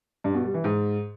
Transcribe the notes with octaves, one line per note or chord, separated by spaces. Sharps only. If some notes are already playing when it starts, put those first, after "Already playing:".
G2
B2
G3
E3
G#2